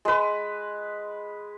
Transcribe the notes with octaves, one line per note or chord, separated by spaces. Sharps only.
G#3 B4